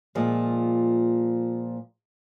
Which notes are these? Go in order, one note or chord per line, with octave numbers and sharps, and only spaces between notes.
A#2 F3 G#3